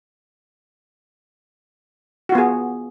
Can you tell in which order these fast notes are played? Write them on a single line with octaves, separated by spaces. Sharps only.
F#4 F4 B3 G#4